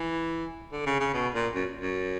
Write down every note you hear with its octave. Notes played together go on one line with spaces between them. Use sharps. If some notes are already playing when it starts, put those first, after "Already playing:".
Already playing: E3
D3
C#3
C#3
B2
A#2
F#2
F#2